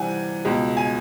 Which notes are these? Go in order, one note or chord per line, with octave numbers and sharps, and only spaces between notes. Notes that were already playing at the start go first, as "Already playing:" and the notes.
Already playing: C3 E3 G3 C4 F#5 G#5
C#2 B2 G#3
G#5